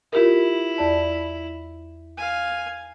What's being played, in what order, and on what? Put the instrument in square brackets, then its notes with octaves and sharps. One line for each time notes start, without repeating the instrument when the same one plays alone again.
[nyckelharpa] E4 [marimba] F4 G4 A#4
[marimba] E2 D5 A5
[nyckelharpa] F5 G#5